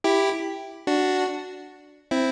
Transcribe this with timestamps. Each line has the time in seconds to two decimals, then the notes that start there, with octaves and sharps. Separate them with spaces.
0.04 E4 G4
0.87 D4 F#4
2.11 C4 E4